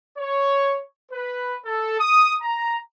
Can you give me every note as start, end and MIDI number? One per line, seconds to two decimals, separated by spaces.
0.17 0.81 73
1.12 1.56 71
1.65 1.98 69
2.00 2.33 87
2.41 2.76 82